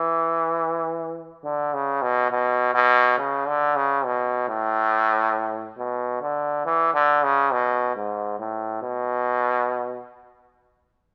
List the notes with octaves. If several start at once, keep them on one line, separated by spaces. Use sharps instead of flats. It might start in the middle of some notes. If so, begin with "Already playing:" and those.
Already playing: E3
D3
C#3
B2
B2
B2
C#3
D3
C#3
B2
A2
B2
D3
E3
D3
C#3
B2
G#2
A2
B2